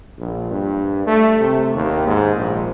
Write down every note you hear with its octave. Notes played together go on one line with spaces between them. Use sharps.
A#1
G2
A3
C3
D#2
G#2
A#1